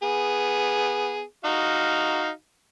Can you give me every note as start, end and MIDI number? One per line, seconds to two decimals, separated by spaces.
0.03 1.22 59
0.03 1.22 68
1.44 2.29 63
1.44 2.29 66
1.44 2.29 77